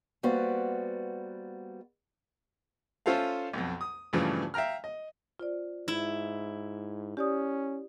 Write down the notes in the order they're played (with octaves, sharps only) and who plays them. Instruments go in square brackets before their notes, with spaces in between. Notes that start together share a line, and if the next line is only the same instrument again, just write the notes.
[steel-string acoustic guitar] G3 A#3 B3 F#4 B4 C5
[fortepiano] C#4 F4 A4 C5 E5 F5
B1 F2
D#6
G2 A#2 C#3 E3 F3 A3
E5 F5 G5 A#5 F6
D#5
[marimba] F4 C5 D5
[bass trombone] G#2 [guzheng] E4
[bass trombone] C#4 [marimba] G4 D5 D#6